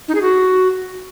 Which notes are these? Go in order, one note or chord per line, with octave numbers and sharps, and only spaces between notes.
D#4
G#4
F#4